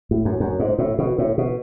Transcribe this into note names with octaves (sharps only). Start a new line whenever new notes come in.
A2
F#2
F#2
G#2
A2
B2
A2
B2